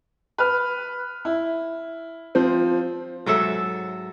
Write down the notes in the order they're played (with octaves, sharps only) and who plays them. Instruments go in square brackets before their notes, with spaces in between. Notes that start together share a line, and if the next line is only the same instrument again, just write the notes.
[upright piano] B4 F6
E4
F3 C4
[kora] G#2 F#3 A4 E5